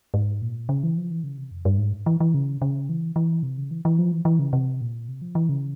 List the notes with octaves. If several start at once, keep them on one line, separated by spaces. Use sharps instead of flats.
G#2
A#2
C#3
E3
F3
E3
C#3
C3
F2
G2
G#2
E3
E3
C#3
C#3
E3
E3
C3
C#3
E3
E3
F3
E3
E3
C#3
C3
A#2
C3
F3
E3
C#3